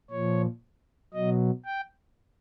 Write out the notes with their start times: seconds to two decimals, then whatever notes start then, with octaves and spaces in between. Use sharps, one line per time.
0.10 A#2 F3 C#5
1.14 B2 F#3 D#5
1.66 G5